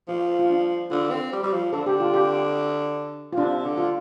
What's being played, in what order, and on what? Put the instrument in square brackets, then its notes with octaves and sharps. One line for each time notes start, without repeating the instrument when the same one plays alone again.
[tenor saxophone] F3 [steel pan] F4
[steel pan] F4
D4
[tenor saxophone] D3 [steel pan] F4
[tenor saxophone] C4
G3
G3
F3
[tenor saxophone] D3 [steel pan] A4
[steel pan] G4
F4
G4
F4
[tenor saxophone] C3 [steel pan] D4
[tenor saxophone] D3
[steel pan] F4